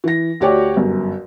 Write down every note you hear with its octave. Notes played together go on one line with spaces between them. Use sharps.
E3 A#6
D2 F#4 G4 C#5 D5 G5
G1 F#2